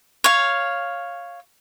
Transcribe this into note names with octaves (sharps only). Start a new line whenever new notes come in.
C#5 F5